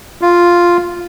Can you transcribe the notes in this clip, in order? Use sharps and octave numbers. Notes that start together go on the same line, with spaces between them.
F4